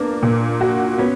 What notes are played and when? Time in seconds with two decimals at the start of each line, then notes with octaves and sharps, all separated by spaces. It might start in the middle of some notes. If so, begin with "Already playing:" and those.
Already playing: A#3 B3 D4
0.23 A#2
0.61 F#4
0.98 B3 C#4